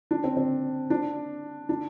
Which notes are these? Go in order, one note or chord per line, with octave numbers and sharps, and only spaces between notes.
D4
C4
C4
D4
D4